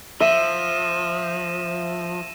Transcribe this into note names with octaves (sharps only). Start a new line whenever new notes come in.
F3 E5 A#6 D#7 E7